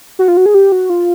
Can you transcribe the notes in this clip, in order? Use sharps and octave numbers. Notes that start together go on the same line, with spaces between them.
F#4
F4
F#4
G#4
G4
F#4
F4